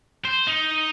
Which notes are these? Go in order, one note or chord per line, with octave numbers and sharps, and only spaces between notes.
C5
D#4